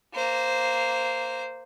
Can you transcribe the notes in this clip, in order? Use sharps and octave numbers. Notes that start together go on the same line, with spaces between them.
A#3 C5